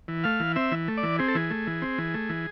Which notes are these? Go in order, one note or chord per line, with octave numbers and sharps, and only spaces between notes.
E3
A3 F5
E3
C4 E5
E3
A3
D5
E3
C4 G#4
A4
E3 G#4
A3
E3
C4
E3
A3
E3